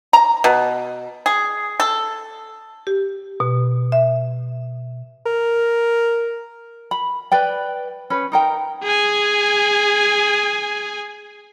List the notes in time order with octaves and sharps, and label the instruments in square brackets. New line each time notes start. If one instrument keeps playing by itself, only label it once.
[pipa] A#5
B2
G#4
A4
[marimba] G4
B2
E5
[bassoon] A#4
[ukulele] B5
B4 D5 G5
C#4 B4
D#4 A#4 G5
[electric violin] G#4 G#5